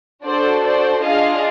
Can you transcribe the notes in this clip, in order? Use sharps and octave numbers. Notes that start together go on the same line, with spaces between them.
D4 F#4 A4 C5 D5
C5 D5
D4 F4 G#4 D#5 F5